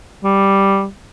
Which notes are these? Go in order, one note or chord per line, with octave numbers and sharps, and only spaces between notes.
G3